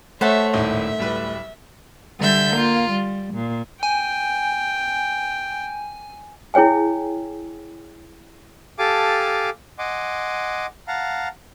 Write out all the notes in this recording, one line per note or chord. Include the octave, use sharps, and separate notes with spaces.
A3 C5 C#5 E5 F#5 A5
D#1 G#1 A2 E5
D1 G3 B4
D3 G3 E5 G6
A#3 F4
G3
A#2
G5 G#5
E4 G#4 C#5 G5 G#5
G4 A4 F5 G#5 A5 D6
D#5 F#5 G#5 C6 D6
F5 F#5 A5 A#5